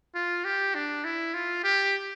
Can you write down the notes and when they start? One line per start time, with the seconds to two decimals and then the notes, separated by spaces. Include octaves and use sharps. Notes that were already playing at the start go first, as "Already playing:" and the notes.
0.15 F4
0.45 G4
0.75 D4
1.05 E4
1.34 F4
1.64 G4